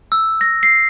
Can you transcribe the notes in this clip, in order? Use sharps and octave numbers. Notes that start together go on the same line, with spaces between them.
E6
A#6
C7